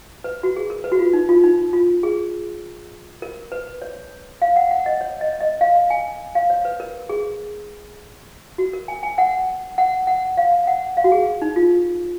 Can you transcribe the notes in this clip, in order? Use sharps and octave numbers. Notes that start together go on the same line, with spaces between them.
B4
F#4
G#4
A#4
B4
F#4
F4
D#4
F4
D#4
F4
G#4
A#4
B4
C#5
F5
F#5
F#5
D#5
C#5
D#5
D#5
F5
G#5
F5
C#5
B4
A#4
G#4
F#4
A#4
G#5
G#5
F#5
F#5
F#5
F5
F#5
F5
F#4
G#4
D#4
F4